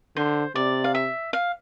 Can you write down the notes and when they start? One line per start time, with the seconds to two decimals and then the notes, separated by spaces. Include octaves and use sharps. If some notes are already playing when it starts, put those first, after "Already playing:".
0.16 D3 C5
0.55 C3 D5
0.84 F5
0.95 E5
1.33 F5